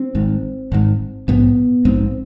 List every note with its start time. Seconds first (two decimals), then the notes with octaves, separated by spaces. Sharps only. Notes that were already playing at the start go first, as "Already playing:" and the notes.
Already playing: C4
0.15 G#1 G#2
0.72 G#1 G#2
1.28 A#1 G#2 B3
1.85 A#1 G#2 C4